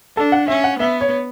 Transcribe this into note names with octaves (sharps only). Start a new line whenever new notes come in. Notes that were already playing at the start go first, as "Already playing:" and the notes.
D4 A4
F#5
C#4 E5
F#5
B3 E5
C#5